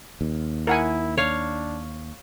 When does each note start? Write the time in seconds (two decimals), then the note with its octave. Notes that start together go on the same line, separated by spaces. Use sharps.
0.21 D#2
0.67 E4 A#4 F#5 G#5
1.17 D4 C#5 F5